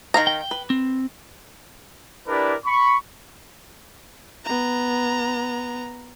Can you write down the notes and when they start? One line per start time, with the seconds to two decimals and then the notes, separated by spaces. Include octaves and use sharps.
0.14 D#3 F5 A#5
0.27 G5
0.51 B4
0.70 C4
2.28 D4 E4 G4 A#4 B4 D5
2.66 B5 C#6
4.45 B3 A#5